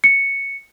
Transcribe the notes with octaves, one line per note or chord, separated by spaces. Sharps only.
C#7